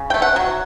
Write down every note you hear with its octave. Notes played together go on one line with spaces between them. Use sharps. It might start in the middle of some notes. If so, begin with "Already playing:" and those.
Already playing: C#3
G5
A3
F#5
F#3